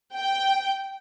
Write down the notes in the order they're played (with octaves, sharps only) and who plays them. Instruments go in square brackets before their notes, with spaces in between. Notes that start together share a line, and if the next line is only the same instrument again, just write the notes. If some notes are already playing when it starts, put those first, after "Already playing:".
[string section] G5